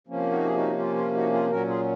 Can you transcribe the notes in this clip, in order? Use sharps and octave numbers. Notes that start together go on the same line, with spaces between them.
C3 F3 A#3 C#4
D#4 F#4
G#4
D#4 F#4
F4
F4
D#4 F#4
F4 G#4
A#2 F#3 C#4 F#4 A#4
F4 G#4